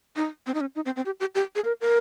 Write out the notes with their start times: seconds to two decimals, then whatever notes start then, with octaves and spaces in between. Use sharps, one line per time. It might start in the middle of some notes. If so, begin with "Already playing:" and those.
0.16 D#4
0.46 C4
0.54 D#4
0.61 C#4
0.75 D#4
0.86 C4
0.96 C4
1.06 G4
1.20 G4
1.35 G4
1.55 G#4
1.64 A#4
1.81 A#4